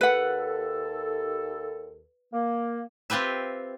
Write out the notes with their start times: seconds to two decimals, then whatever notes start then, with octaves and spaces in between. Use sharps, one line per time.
0.01 D#2 A4 B4 F#5
2.33 A#3
3.10 C4 F4 G4 B4 E5